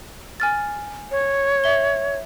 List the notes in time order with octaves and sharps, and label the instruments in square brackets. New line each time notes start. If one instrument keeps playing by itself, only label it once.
[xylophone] G#5 F6 A6
[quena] C#5
[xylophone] E5 G7